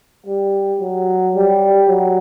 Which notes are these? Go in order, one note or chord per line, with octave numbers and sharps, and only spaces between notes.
G3
F#3
G3
F#3